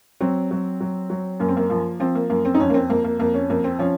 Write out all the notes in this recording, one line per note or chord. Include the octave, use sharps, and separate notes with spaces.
F#3 C4
F#3
F#3
F#3
F#2 A#3
C4
A#3
F3 A#3
F3 C4
A#3
F#2 A#3
C4
D#4
F2 C#4
A#3
C4
F2 A#3
A#3
F2 A#3
C#4
F2 A#3
C4
F3 C#4